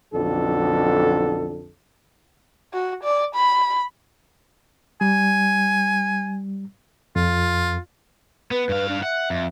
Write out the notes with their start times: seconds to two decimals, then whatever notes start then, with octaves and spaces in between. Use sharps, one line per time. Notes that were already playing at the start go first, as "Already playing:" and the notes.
0.13 B1 F2 D3 A4
2.73 F#4
3.04 D5
3.35 B5
5.01 G3 G#5
7.16 F2 F4
8.51 B3 B4
8.69 G2 F5
8.89 D4
9.03 E5 F#5
9.30 F2